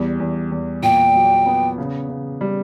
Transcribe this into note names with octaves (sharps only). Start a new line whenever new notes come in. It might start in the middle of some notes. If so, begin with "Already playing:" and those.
Already playing: E2 G3
E2
E2
A#2 G5
F#3
B3
C#3
C#3
G3